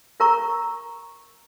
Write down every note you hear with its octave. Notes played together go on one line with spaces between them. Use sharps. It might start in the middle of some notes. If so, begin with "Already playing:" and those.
F4 A#4 A#5 C#6